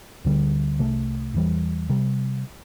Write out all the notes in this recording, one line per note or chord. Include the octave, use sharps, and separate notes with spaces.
D2 D3 G3
C2 C3 A3
E2 E3 G3
C3 G3